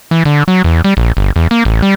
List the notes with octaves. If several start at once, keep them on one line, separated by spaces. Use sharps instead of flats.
E3
D3
F#3
E2
G3
A#1
G1
E2
A#3
A1
G3